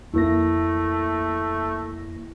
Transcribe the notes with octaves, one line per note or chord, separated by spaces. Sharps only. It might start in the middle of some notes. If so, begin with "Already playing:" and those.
F2 A3 A#3 E4 A#6